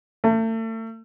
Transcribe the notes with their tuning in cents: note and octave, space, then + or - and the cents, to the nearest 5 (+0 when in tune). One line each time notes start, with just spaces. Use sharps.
A3 +35